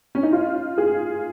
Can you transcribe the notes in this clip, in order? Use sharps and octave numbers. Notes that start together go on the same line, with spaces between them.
C#4
D#4
F4
G#4